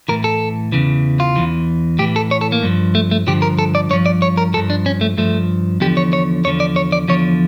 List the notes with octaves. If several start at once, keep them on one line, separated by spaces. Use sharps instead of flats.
A2 E3 A#4
A4
E2 C#3 E3
F4
E2 E3
A2 E3 G4
A4
C#5
A4
A#3
G2 F3
A3
A3
G2 D3 F3 G4
A#4
A4
D5
G2 F3 C#5
D5
C#5
A#4
G2 F3 A4
D4
C#4
A3
G2 F3 A3
E2 D3 F3 G4
C#5
C#5
E2 D3 F3 C#5
D5
C#5
D5
E2 D3 F3 C#5